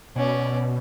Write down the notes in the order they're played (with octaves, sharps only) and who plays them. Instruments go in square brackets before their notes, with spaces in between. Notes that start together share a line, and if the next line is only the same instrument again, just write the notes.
[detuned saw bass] B2 [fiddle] C#4 D5